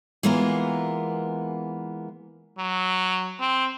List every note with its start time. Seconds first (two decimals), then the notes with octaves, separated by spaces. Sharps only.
0.23 E3 G#3 A#3 B3 F4 A#4
2.59 F#3
3.40 C4